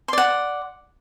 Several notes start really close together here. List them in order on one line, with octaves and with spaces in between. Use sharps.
C6 D5 F#5